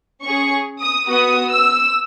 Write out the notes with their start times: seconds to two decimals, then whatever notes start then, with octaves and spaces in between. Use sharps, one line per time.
0.23 C#4 G#4 C#6
0.80 D#6
1.08 B3 F#4 D#6
1.50 E6